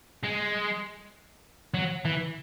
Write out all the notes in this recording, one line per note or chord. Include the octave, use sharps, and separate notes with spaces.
G#3
F#3
E3